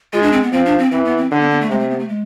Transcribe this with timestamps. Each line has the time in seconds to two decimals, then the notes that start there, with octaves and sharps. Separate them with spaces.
0.13 G#3 F4
0.22 D4
0.33 C4
0.43 B3
0.52 F3 C4
0.66 D4
0.79 C4
0.91 E3 C4
1.05 B3
1.18 C4
1.31 D3 D4
1.40 B3
1.51 B3
1.61 A3
1.70 C3 G#3
1.80 A3
1.90 B3
1.99 A3
2.09 G#3